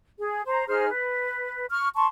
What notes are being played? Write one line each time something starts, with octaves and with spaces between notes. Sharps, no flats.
G#4
C5 A#5
D#4 G#4 C5 F6
B4
C#6 F6
A5 C6 C#6